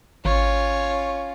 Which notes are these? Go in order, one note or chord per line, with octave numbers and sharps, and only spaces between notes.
G#1 C#4 F4 C#5